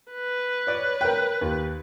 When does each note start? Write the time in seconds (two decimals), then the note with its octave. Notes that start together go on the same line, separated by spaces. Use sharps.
0.12 B4
0.67 C#5 D5
1.01 A#4 G5
1.41 D#2